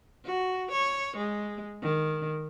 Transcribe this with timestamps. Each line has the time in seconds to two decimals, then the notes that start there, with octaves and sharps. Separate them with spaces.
0.25 F#4
0.72 C#5
1.17 G#3
1.82 D#3